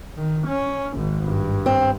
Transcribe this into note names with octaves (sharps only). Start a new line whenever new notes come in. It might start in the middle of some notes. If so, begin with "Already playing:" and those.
D#3
C#4
G#1 G#2
G2
C4